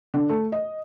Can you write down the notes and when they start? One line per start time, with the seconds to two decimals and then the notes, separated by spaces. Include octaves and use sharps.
0.14 D3
0.29 A3
0.52 D#5